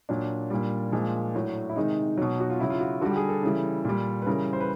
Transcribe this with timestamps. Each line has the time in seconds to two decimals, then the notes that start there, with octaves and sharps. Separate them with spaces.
0.09 A#2 F#3 D4
0.50 A#2 G3
0.92 A#2 F3 G#3
1.34 A2 F#3
1.69 E4
1.76 C3 D#3 G#3 D#4
2.18 B2 F#3
2.40 F#4
2.50 F4
2.60 C#3 F#3 E4
2.70 F4
2.81 F#4
3.01 D3 G3 F#4
3.10 G4
3.16 G#4
3.29 A4
3.43 C#3 E3 G3
3.85 A#2 G3
4.22 B4
4.26 C#3 E3 G3 A#4
4.53 C5
4.61 B4